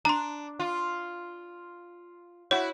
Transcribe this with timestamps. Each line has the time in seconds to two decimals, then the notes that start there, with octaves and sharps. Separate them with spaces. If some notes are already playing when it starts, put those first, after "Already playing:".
0.05 D4 A#5 C6
0.59 F4
2.51 E4 F#4 C#5